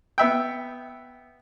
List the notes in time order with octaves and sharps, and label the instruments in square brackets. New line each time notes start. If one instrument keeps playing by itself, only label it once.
[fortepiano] B3 E5 G5